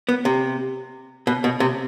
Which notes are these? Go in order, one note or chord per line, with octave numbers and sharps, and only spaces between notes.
B3
C3
B2
B2
C3